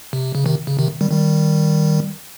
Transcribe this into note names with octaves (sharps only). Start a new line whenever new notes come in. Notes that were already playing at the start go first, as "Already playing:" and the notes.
C3
C#3
C3 D#3
C#3
C3 D#3
D#3 G3
D#3 G3